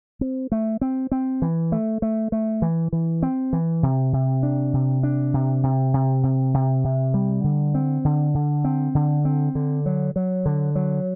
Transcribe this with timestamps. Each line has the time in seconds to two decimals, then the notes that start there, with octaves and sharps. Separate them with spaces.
0.21 C4
0.52 A3
0.81 C4
1.12 C4
1.42 E3
1.72 A3
2.02 A3
2.32 A3
2.62 E3
2.93 E3
3.23 C4
3.53 E3
3.83 C3
4.13 C3
4.43 D4
4.74 C3
5.03 D4
5.34 C3
5.63 C3
5.94 C3
6.23 C3
6.54 C3
6.84 C3
7.14 G3
7.44 D3
7.75 C4
8.05 D3
8.35 D3
8.64 C4
8.95 D3
9.25 C4
9.55 D3
9.86 F#3
10.16 F#3
10.46 D3
10.75 F#3